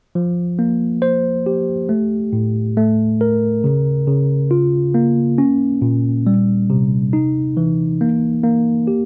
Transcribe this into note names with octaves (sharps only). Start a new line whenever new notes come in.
F3
A#3
C5
G4
A3
A2
A3
A#4
C#3
C#3
F4
A#3
C#4
A#2
G3
C3
D#4
E3
A#3
A#3
G4